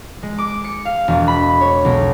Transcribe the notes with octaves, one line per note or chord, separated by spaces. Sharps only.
G#3
D6
C#7
F5
E1
B5
C#5
B1